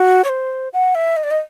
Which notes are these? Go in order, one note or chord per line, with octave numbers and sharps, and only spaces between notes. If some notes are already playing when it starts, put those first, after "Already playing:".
Already playing: F#4
C#5
C5
F#5
E5
D#5
D5
D#5